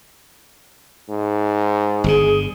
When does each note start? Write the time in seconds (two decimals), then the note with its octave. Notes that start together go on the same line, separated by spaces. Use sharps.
1.09 G#2
2.04 G1 A#2 D3 G#4